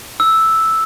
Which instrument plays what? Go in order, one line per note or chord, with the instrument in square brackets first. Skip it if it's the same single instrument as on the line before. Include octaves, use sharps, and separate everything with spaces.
[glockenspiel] E6